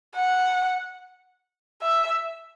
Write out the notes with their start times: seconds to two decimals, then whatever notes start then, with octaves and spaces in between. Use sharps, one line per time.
0.16 F#5
1.83 E5